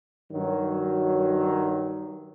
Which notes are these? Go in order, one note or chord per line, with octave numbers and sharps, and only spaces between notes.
G2 D#3 F#3